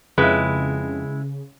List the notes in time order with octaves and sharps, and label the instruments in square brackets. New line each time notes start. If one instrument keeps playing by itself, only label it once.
[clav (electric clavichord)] F2 [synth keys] C#3 [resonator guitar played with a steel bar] G#3 E4 [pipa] B4